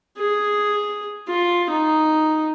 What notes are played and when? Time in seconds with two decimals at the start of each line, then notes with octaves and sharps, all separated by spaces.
0.18 G#4
1.28 F4
1.70 D#4